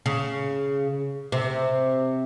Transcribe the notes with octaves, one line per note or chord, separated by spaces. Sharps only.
C#3
C3